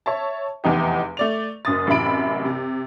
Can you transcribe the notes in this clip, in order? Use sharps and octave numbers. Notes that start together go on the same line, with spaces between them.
C#5 E5 A5
F1 E2 E3 D#4 G4
A3 D5 F7
F#1 F#2 D#6 A6
A1 F#2 C3 E4 B5 D7
C3